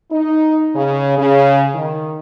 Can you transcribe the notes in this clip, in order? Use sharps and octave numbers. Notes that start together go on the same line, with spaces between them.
D#4
C#3
C#3
D#3